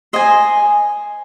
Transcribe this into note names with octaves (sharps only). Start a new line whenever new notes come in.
C5 D#5 G#5